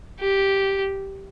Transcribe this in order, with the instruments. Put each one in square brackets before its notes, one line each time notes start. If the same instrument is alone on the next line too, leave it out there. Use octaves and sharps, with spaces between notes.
[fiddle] G4